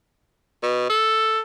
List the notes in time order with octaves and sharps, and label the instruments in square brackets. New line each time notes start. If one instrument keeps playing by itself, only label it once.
[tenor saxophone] B2
A4